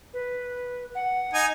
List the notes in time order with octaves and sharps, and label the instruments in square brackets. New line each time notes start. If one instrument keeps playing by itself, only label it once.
[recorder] B4
F#5
[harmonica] D#4 G#5